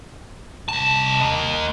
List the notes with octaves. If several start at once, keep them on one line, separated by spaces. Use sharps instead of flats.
C2 A5
A#3 D#5